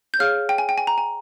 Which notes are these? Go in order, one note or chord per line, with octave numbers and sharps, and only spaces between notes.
G6
G#4 C#5 F5 F6
G5
G#5
G5
G#5
A#5
G#5